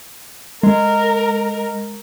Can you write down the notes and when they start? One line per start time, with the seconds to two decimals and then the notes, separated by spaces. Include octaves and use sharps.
0.63 G#3 A#4